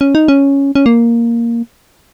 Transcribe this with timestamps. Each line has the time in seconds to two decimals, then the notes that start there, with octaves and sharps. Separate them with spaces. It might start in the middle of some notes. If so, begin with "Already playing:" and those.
0.01 C#4
0.15 D#4
0.28 C#4
0.75 C#4
0.86 A#3